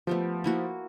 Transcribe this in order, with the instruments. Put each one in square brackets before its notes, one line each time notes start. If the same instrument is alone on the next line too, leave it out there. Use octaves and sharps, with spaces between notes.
[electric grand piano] F3 [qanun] A3 B3 G4
[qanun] A#3 E4 F#4